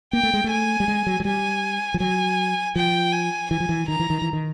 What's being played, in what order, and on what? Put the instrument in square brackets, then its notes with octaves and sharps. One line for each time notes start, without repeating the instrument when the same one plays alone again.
[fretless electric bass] A#3 [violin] G5
[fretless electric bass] A3
G#3
A3
[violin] G#5
[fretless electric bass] G3
G#3
F#3
F#3
[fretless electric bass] G3 [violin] G#5
[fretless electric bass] F3
[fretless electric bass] F#3 [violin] G#5
[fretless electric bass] F3 [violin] G5
[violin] G#5
[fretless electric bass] E3 [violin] G#5
[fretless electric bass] F3
E3
[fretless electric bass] D#3 [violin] A#5
[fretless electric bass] E3
D#3
E3
D#3